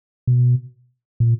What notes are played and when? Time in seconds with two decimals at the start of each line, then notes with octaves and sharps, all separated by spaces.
0.27 B2
1.20 A#2